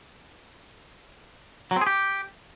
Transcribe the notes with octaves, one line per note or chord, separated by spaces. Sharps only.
F#3
C4
G#4
G4